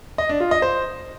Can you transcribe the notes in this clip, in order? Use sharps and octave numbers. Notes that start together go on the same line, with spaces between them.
D#5
D4
F4
D#5
C5